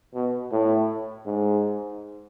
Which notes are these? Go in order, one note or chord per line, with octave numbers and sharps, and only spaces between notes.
B2
A2
G#2